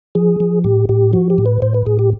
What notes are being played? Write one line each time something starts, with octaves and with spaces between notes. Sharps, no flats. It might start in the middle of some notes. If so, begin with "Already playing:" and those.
F3 G#4
F3
A2 G4
A2 G4
F3 F#4
G4
A2
B4
A2 C5
B4
A2 G#4
G4